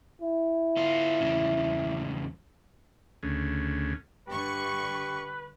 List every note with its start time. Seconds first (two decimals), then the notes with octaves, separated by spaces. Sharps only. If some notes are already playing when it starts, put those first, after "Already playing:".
0.21 E4
0.77 B3 F4
1.21 E2 G2 C#3
3.23 D2 C#3
4.28 G2 D3 G4 B4 C#6